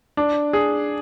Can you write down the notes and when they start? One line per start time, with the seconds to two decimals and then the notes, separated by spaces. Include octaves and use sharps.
0.17 D4
0.53 G#4